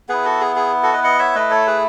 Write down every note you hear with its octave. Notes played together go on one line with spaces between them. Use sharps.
B3 E4 G#4 B4
F#4 A4
G#4
G#4
F#4 A4
B4 D#5
D#5 F#5
C#5 E5
A3 E4 B4 D#5
A4 C#5
G#4 B4